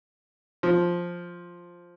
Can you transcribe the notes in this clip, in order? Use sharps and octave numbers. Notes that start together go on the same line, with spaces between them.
F3